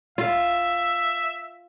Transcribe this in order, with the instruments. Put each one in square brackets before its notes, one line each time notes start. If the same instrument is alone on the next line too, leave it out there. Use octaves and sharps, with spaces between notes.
[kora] F4 [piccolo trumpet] E5